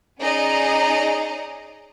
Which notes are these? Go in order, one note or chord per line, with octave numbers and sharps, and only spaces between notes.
C#4 D#4 G#4 D5 D#5 A#5